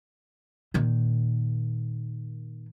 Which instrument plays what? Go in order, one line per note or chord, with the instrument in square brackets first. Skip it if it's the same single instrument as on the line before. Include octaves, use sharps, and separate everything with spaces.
[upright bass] A#2 D#3